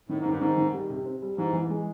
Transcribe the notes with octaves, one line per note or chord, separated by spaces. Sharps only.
A2 D#3
G#2
G2 D#3
G#2 D#3
D#3
G3
C3
C4
G3
G#2 E3
E3
G#3